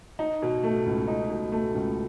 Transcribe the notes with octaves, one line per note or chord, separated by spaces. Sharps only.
D#4
B2
A3
C#2
D#4
B2
A3
C#2